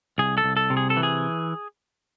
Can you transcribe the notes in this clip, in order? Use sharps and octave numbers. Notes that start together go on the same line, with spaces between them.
C2 G#4
A4
C2
A4
C3
G#4
A4
E3
G#4